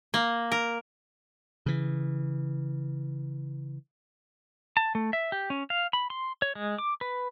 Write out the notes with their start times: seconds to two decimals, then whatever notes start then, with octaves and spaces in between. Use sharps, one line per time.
0.14 A#3
0.52 A#4
1.66 C#3 E3
4.77 A5
4.95 A3
5.13 E5
5.32 G4
5.50 C#4
5.70 F5
5.93 B5
6.10 C6
6.42 C#5
6.55 G#3
6.78 D6
7.01 B4